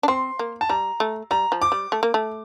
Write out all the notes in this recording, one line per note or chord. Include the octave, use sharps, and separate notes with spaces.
D4
C4 C6
A#3
A5
G3 A#5
A3
G3 A#5
F3
D6
G3
A3
A#3
A3